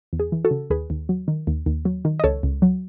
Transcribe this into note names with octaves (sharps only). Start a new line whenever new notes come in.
E2
G#4
E3
F#4 A4
C#3
D#2 G#4 B4
D#2
F#3
D#3
D#2
D#2
F#3
D#3
D#5
C#2 A4 C#5
C#2
F#3